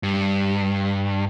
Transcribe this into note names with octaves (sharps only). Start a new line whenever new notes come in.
G2